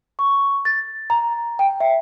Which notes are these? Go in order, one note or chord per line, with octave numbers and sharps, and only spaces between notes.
C#6
A6
A#5
G5
E5